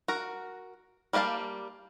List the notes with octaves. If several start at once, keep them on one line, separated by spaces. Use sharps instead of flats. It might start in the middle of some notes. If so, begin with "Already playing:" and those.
F#4 A#4
G3 A#3 G4 F5 A5